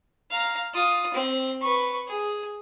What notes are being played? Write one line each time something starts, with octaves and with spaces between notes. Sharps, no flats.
F5 A#5
F4 D#6
C4
B4 C#6
G#4